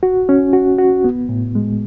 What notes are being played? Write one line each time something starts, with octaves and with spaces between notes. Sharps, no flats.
F#4
C#4
F#4
F#4
B3
A2
G#3